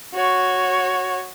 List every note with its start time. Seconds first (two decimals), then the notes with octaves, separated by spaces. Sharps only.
0.14 F#4 C#5